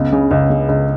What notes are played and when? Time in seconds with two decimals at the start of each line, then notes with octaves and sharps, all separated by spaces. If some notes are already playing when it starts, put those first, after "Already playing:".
Already playing: C#2 B3
0.12 C#3
0.31 C#2
0.50 C#3
0.68 C#2